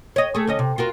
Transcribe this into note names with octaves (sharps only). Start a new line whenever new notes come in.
C#5 D#5
A3 G#4
D2 C#4 D#5
C3
F4 F#4 A#4